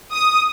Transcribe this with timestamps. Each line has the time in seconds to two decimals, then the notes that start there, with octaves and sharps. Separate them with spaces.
0.12 D#6